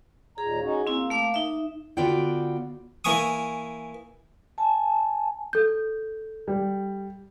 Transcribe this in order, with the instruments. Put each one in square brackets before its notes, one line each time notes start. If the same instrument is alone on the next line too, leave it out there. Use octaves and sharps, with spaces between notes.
[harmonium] D#2 A#2 A#5 [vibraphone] G#4
[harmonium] C#4 D#4 F#4
[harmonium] A#3 [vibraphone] C4 E4
[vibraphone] A3 F5 D6
D#4 E5
[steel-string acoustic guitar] D3 B3 F4 F#4 D5 G5
[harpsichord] E3 A#3 G#5 C#6 D#6
[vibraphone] G#5 A5
[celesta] A4 G6
[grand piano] G3